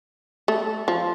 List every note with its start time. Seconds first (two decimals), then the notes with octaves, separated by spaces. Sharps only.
0.48 A3
0.88 F3